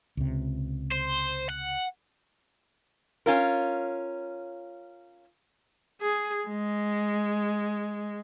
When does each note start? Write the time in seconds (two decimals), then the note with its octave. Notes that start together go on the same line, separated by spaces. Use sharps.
0.17 C#2 C3
0.92 C5
1.49 F#5
3.26 C#4 F4 A#4
6.01 G#4
6.48 G#3